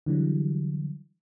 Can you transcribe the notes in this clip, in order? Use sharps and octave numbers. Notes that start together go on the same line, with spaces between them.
D3 E3 F#3 G3